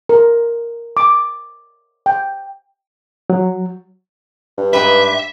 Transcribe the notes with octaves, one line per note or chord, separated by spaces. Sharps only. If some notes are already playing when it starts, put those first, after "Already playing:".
A#4
D6
G5
F#3
G2
G#2 G4 B4 E5